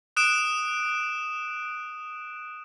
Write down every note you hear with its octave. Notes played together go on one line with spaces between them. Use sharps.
D#6 F#6 D7 E7